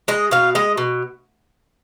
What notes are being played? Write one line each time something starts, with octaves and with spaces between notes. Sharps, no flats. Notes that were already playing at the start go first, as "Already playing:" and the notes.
G#3 D#5
B2 F5
G#3 D#5
B2